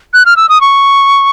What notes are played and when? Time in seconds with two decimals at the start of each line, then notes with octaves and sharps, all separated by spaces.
0.14 F#6
0.26 F6
0.37 E6
0.49 D#6
0.61 C#6